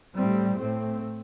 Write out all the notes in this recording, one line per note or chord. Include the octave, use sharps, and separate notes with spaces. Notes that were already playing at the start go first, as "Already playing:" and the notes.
A2 G3 C4
A2 A3 C4